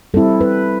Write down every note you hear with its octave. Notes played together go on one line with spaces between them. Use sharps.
G3 C4 E4 A4
B4